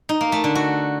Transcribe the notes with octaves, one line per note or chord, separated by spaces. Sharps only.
D#4
A#3
A3
D3
F#4